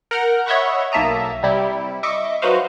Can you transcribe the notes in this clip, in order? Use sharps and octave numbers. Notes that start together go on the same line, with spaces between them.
A#4 F#5 F6 G6 A#6
C#5 D#5 E5 F#5 B5 C#6
B1 A#3 E5 A5 A#5 D#6
C3 G3 E4 G4
D#5 E5 C#6 D6 C#7
F#3 D#4 F#4 B4 C5 F5